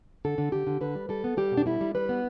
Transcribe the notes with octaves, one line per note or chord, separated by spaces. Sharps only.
D3 A4
D3
D3 G4
D3
D3 B4
G3
G3 A4
B3
G3 G4
B2
D4
G3 E4
G3
G3 B4
B3